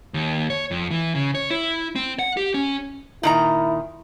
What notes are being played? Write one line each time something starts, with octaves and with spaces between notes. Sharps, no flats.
D#2
C#5
F2
E3
C#3
C#5
E4
C4
F#5
G4
C#4
A#2 D#3 E4 A#5